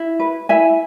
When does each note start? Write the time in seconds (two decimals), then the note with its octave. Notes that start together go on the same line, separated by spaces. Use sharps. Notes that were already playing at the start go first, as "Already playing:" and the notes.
Already playing: E4
0.19 B4
0.49 E4 E5 G#5